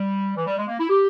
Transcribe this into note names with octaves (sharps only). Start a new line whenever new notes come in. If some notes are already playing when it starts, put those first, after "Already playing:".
Already playing: G3
E3
G3
G#3
A#3
E4
G4